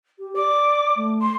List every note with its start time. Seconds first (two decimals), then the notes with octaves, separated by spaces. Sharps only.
0.18 G4
0.36 D5 D6
0.96 A3
1.22 C6